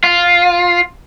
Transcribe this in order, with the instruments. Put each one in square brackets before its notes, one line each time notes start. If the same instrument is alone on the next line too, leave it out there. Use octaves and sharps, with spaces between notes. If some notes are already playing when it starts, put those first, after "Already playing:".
[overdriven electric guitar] F4